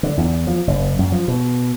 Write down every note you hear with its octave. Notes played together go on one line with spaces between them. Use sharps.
D3
E2
F3
F#1
F#2
F3
B2